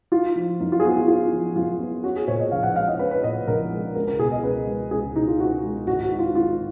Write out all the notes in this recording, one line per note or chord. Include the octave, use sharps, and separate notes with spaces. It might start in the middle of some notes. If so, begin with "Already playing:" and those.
D#4 F4
F3
F#2 D#4
F4
G#4
B3 F#4
F4
D#4 F4
F3
F#2 F4
B3
C#4 F#4
G#4
A#2 C#5
D#5
A#1 F5
F#5
G#3 F5
D#5
C#4 B4
B4
A#2 D#5
A#1 A#4
G#3
C#2 A#4
A#4
B2 G#4
D#5
C#2 B4
G#3
C#2 G#4
B2 D#4
F4
C#2 F#4
G#3
G#1 F#4
F#4
G#2
F4
G#1 F4